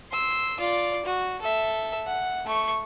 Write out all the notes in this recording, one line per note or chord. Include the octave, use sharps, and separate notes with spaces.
C6 E6
F4 D5
F#4
A4 E5
F#5
A3 C#6